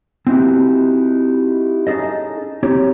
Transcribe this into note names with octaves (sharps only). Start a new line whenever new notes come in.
C4 C#4 D#4 E4 F#4 G4
C#4 D#4 G#4 A4 D#5
C4 D#4 G4 C#5